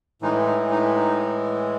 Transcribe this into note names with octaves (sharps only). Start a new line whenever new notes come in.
A2 E3 G#3 D#4
D#4
D#4
D#4